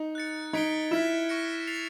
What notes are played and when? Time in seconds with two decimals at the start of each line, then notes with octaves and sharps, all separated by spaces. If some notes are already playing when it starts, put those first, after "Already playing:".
Already playing: D#4
0.15 F#6 A6 C#7
0.53 D#4 G#6 B6 D7 G7
0.91 E4 F6 G#6 B6 E7
1.29 C#6 F6 A#6 C#7
1.67 A6 C7 F7